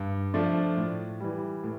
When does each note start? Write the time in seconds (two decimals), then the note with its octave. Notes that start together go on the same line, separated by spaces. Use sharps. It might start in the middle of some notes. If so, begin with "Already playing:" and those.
Already playing: G2
0.34 F3 A3 D4 F4
0.77 A2
1.20 E3 G3
1.64 A2